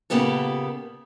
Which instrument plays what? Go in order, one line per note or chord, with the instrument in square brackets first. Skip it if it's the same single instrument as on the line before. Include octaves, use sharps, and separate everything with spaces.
[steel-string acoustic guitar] A#2 C#3 A#3 B3 G4 A4